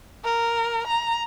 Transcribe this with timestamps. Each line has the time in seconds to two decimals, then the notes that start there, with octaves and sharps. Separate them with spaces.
0.24 A#4
0.87 A#5